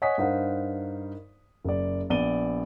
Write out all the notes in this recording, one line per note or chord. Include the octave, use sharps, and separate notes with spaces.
C#5 D#5 F#5 G#5 D#6 B6
G2 D#4 A#4 C5 F5 F#5
F#1 D5
A#1 B3 D5 D#7 G7